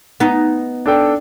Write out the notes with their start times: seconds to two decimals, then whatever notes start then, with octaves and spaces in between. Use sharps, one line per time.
0.20 B3 D#4
0.86 D4 A4 G5